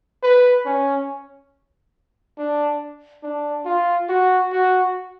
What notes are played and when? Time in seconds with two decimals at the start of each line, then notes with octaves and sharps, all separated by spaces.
0.23 B4
0.66 C#4
2.38 D4
3.23 D4
3.65 F4
4.09 F#4
4.52 F#4